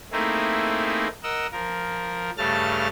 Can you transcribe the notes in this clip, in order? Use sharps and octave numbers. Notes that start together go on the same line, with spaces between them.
A3 A#3 C4 D#4 E4 G#4
A#4 D#5 F#5 E6
F3 A#4
G2 C#3 A3 A5 F6 A6